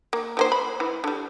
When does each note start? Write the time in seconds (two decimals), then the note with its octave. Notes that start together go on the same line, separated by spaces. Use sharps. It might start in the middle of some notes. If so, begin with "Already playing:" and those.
0.13 A#3
0.37 F3 A#3 C5
0.52 B5
0.80 E3
1.04 D3 G3